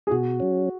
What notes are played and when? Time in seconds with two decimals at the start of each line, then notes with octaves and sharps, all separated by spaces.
0.07 G#4
0.11 B2 F#4
0.40 F#3 C#4